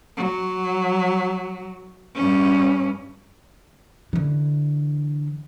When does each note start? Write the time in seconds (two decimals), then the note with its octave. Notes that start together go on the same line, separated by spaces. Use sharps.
0.17 F#3
2.16 G2 C#4
4.13 D3 E3